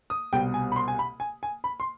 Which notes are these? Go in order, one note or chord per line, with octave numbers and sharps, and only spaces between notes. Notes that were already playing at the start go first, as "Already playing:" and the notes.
D#6
C2 B2 G3 G5
G#5
B5
C6
G#5
B5
G#5
G#5
B5
C6